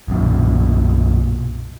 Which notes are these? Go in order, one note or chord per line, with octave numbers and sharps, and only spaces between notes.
B1 F#2 A#2